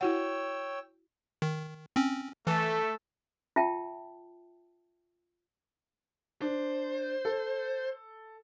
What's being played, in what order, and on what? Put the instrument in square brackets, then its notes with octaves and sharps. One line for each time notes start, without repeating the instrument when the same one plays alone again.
[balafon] E4 F#4 F#5 [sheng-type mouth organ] C#5 G5 E6
[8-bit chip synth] D#3
C4 C#4
[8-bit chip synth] E3 [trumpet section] A3 A4
[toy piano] F4 E5 G5 A5
[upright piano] D4 [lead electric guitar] C5
[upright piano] A4